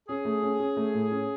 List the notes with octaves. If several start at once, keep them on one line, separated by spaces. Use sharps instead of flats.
C#4 G#4
A3
C#4
C#4
A3
A2
C#4